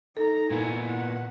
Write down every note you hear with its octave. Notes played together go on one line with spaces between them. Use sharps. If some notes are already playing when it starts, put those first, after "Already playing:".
D#4 A4 A#5
A#2 A#3 B3 E4 G#5
F#5